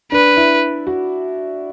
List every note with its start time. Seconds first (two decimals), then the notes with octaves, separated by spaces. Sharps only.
0.12 D4 B4
0.37 E4
0.87 F#4